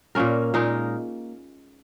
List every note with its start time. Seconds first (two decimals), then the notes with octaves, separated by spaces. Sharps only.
0.15 A#2 A#3 C#4 A#4
0.54 A#2 G#3 D#4 A#4